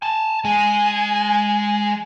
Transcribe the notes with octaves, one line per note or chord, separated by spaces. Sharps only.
G#5 A5
G#3 G#4 G#5